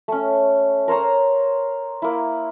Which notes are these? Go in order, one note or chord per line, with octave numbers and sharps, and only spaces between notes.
A3 C#4
A#4 C5 C#5 A#5
A#3 E4